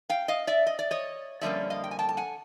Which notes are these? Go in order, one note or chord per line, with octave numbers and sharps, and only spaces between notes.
F5 G5
D#5 F5
D5 E5
D#5
D5
C#5 D#5
F2 D3 G3 A#3 C#4 D5 E5
D#5 F5
G5
G#5
G5 A5
A5
F#5 G#5